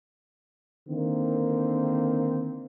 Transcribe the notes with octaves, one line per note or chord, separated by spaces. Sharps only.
D3 D#3 A#3 C4